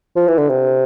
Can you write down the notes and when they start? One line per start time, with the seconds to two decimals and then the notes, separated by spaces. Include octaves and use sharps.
0.16 F3
0.28 E3
0.38 D3
0.49 C3